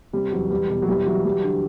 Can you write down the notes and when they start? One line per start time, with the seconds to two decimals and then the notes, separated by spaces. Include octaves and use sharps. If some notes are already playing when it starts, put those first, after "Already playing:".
0.13 C3 G3
0.32 E2 F#3
0.51 E2 G3
0.70 B2
0.82 F#3
0.88 E3 G3
1.06 E3 F#3
1.24 F#3 G3
1.44 D3